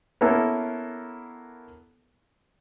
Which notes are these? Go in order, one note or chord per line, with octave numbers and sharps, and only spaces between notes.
A#3 B3 C#4 E4 A4 A#4